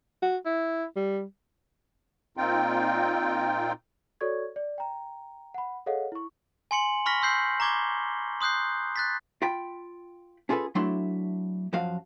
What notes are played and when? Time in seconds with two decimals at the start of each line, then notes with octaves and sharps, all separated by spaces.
0.22 F#4
0.45 E4
0.96 G3
2.37 A#2 C4 D#4 F4 G5
4.21 F#4 A4 C#5 D5 C#6 G#6
4.56 D5
4.78 G5 A#5
5.54 F#5 B5
5.86 G#4 A4 C#5 D#5 F5 F#5
6.12 E4 C#6
6.71 G#5 C6 C#7 F#7
7.06 B5 C#6 F6 A#6 B6 F#7
7.22 C6 E6 G6 C7
7.60 A#5 C#6 D6 G#6 G7
8.41 C6 D#6 F#6 G6 C7
8.96 F#6 A6 B6
9.42 F4 G5 B5
10.49 C#4 F4 G#4 A4 B4
10.75 F#3 A3 D4 E4 C6
11.73 F#2 F3 F#4 F5